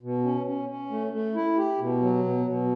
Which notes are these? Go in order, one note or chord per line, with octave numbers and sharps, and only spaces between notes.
B2
C#4
C#4
C#4
A3
A3
E4
G4
B2
F#3
B2
B2